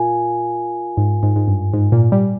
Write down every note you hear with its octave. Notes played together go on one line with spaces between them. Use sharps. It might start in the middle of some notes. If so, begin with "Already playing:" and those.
Already playing: A#2 F4 A#4 F5 G#5
G#2
G#2
G#2
G2
G#2
A#2
G3